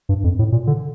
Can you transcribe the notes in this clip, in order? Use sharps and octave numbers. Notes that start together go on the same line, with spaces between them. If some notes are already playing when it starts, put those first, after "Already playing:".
G2
F2
A2
A#2
D3